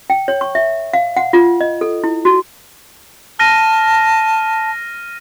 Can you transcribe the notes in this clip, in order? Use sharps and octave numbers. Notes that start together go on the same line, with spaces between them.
G5
C#5
C#6
E5
F5
F#5
F4
D#5
A4
E4
F#4
A5 F6 A#6 D#7